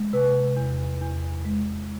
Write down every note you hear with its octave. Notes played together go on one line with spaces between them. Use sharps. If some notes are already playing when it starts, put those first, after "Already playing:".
Already playing: G#3
C3 B4
E2
E2
G#3